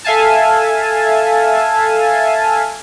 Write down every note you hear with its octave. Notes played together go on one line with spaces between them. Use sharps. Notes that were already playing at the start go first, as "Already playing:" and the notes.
A4 E5 F5 G#5 A5